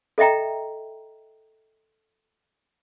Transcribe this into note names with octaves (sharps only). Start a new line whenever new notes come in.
A4 D#5 E5 G5 A#5